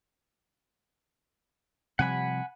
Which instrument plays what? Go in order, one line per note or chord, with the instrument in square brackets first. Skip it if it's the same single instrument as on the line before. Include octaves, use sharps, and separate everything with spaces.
[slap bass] C3 F3 G3 [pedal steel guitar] F#5 G#5 B5